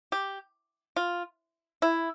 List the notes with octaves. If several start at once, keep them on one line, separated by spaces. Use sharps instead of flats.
G4
F4
E4